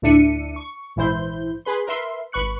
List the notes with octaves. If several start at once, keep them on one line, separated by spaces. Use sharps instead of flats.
D2 A2 D4 E5 C#7 D#7
C#6
A#1 G#2 E3 E4 C5 G6
G#4 B4 C6
A#4 B4 E5 C6
G#1 B4 C#6 F#6 C#7